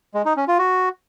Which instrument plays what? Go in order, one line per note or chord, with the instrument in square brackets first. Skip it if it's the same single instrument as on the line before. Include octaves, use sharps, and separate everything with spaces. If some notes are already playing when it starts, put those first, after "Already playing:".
[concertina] G#3
D#4
C#4
F4
F#4